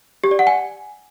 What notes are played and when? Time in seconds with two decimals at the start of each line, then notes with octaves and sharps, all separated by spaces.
0.24 G4
0.31 D5
0.39 F#5
0.47 G#5